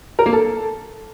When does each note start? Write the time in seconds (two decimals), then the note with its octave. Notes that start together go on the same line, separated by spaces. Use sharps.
0.19 A#4
0.26 A#3
0.33 A4